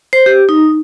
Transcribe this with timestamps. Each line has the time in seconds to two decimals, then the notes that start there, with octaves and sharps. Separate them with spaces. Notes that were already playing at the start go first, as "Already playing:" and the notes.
0.13 C5
0.26 G4
0.49 D#4